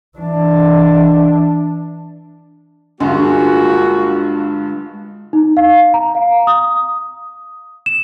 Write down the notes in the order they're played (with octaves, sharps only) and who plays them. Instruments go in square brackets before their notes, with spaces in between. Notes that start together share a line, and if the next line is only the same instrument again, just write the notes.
[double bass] E3 D4
[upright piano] G2 D3 [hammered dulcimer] G#3 F4 [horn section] A#3 B3 F#4
[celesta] D#4
F5
A#5
F5
D#6
E7